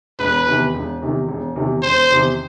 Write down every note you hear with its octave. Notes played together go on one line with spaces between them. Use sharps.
E1 B4
E2 C3 D#3
E1
E2 C3 D#3
E1
E2 C3 D#3
E1 C5
E2 C3 D#3